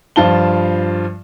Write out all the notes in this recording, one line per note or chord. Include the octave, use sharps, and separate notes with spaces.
G2 F3 F4 A5 G7